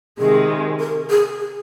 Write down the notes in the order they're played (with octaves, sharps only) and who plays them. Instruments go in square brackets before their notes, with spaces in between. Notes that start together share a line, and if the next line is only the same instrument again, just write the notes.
[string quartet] C3 D#3 G#3 [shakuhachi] G#4
[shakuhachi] A#4
G#4
G#4